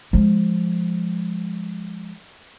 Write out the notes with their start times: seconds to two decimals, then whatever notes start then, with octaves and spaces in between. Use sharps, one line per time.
0.13 F3 G#3